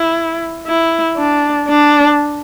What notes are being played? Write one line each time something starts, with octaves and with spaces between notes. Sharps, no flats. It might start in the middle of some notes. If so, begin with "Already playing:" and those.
Already playing: E4
E4
D4
D4